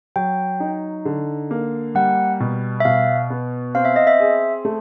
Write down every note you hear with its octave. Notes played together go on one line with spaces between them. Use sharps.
F#3 G5
D#4
D3
A#3
G3 F#5
B2
E5
B2 F5
B3
C4 F5
E5
D#5
E5
G#4
A3